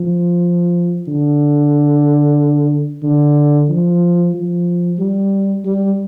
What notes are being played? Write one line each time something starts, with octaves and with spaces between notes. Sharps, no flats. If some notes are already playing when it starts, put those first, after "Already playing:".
Already playing: F3
D3
D3
F3
F3
G3
G3